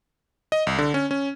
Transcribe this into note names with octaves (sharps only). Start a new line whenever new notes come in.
D#5
C2
D3
C#4
C#4